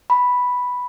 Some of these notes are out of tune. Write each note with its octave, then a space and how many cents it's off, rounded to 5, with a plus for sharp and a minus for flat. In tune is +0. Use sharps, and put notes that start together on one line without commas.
B5 +0